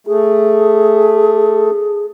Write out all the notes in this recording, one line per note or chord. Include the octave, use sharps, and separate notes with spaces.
A3 G#4